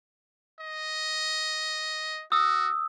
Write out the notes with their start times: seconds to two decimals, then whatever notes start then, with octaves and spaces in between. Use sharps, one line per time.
0.60 D#5
2.32 F#4 D#6 E6